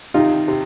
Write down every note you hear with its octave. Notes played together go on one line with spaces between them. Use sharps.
C3 D#3 D#4 F4
C3